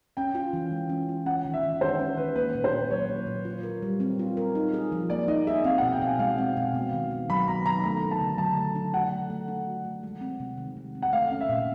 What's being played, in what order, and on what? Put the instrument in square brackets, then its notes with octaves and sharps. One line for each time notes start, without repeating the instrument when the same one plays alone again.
[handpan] C#4 [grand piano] G5
[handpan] F4
E3
G#3
C#4
F4
[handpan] C#4 [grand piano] F#5
[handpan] D#3
[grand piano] E5
[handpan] D#3
[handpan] G#3 [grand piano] C5
[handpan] C#4
[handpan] D#3 [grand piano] B4
[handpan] A#3 [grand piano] B4
[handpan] A#2
[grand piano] C5
[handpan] A#2
[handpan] F#3 [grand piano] C#5
[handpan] A#3
A#2
F4
A#4
G3
C4
F4
A#4
D#4
G#4
F3
[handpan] A#3 [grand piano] D5
[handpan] D#4 [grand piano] D#5
[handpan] G#4 [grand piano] E5
[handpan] C4 [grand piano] F5
[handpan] B2 [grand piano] F#5
[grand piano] G5
[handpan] B2 [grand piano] G#5
[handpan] G#3 [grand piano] F5
[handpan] C4
B2
B3
D#3
D#3
[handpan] F#3 [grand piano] B5
[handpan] B3 [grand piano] A#5
[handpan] D#3 [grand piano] A#5
[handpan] A3 [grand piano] A#5
[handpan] D4
[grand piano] A5
[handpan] D3
[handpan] F#3 [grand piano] A5
[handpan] A3
D4
[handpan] F#4 [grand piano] F#5
[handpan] A3
A3
D4
F#4
A3
G#3
C4
C3
D#3
G#3
C4
[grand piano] F#5
[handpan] A3 [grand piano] F5
[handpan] C#4
[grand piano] E5
[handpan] A#2